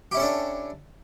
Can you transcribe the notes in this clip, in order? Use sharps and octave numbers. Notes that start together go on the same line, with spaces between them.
C#4 D4 E4 G4 A4